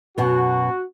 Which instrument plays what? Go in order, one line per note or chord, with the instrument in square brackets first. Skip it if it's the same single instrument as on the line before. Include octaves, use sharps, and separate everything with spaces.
[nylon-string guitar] F#2 B2 B3 [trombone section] F#4